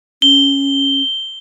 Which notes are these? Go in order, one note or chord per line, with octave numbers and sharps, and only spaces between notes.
C#4 G7